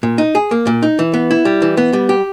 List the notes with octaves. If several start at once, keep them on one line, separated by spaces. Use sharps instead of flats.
A#2
D#4
G#4
A#3
A#2
D#4
E3
B3
E4
G3
E3
B3
G3
G4